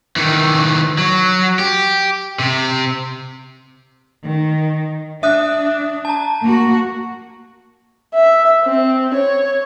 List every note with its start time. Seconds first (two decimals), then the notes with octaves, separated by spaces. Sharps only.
0.16 D#3 E3
0.98 F#3
1.59 G4
2.39 C3
4.24 D#3
5.23 D4 E5 D#6 F#6
6.05 A5 A#5
6.42 A#3 F#4
8.15 E5
8.63 C4
9.14 C#5